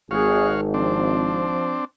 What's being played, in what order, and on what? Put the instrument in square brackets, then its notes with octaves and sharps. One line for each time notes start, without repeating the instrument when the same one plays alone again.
[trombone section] G#1 [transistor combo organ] F#4 C#5 F5 [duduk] G#4
[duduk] F3 [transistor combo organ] C4 D4